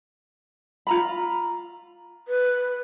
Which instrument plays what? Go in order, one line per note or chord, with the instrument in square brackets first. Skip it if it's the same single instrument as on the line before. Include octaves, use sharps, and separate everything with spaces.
[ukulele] F4 A#5 B5
[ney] B4